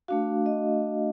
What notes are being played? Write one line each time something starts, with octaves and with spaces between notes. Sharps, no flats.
A3 D4 F#4 F5
D#5